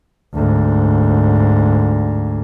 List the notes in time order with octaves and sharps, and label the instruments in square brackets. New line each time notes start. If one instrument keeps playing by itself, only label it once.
[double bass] D2 G#2